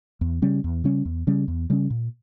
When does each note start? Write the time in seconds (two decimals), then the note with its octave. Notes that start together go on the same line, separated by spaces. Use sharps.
0.21 E2
0.42 C#3 G3 C#4
0.64 E2
0.84 C#3 G3 C#4
1.05 E2
1.27 C#3 G3 C#4
1.48 E2
1.70 C#3 G3 C#4
1.90 A#2